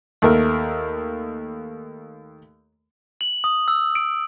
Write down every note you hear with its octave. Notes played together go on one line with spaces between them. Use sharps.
D#2 A3 A#4
F#7
D#6
E6
D7